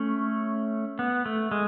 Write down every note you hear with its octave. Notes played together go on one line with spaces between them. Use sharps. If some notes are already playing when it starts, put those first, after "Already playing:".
Already playing: A3 C#4
B3
A3
G#3